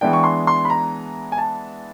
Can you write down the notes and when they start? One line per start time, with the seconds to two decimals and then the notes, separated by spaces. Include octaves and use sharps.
0.01 E3 G#3 B3 D4 G5
0.13 C#6
0.24 C6
0.47 C6
0.65 B5
0.70 A#5
1.32 G#5
1.38 A5